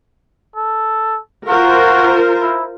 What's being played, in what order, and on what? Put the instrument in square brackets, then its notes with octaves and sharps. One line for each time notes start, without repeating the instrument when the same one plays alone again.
[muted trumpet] A4
[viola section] F4 A#4 C5 [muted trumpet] F#4
[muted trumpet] E4